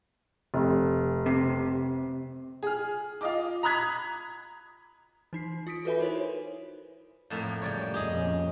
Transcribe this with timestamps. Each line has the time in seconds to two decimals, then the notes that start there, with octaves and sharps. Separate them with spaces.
0.54 F1
1.26 C3
2.63 G#4 F6
3.21 F4 D#5 D6
3.63 A#5 B5 D#6 F#6 G#6 B6
5.33 E3 D#4 C7
5.67 F4 D#6 B6 D7
5.85 F#4 A4 B4 E5 G#5 B5
6.00 D#4 E4 A#4 C5 C#5
7.30 F2 A2 A#3
7.62 C#3 G3 C#4 C#5 D5 G5
7.94 F2 A#2 C#4 G4 G#4 D#5